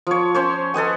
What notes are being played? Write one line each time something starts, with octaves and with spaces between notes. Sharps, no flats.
F3 C#5
C#4 C5 C#5
A4 B4 D#5 G#5